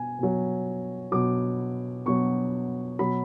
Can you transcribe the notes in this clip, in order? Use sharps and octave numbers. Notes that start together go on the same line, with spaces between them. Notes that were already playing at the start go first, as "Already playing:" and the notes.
Already playing: B2 G#5
B2 F#3
B2 F#3 D6
B2 F#3 C#6
B2 F#3 B5